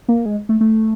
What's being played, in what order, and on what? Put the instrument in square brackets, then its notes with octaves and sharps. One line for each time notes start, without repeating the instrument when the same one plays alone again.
[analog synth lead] A#3
G#3
A3
A3